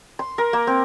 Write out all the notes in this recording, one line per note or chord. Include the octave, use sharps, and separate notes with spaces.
C6
A#4
A#3
C4